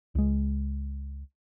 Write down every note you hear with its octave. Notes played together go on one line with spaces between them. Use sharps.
C#2 G#3